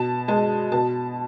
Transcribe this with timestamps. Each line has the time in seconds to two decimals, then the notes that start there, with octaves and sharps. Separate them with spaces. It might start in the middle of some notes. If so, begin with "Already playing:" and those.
Already playing: B2 A5
0.28 G#3 A5
0.72 B2 A5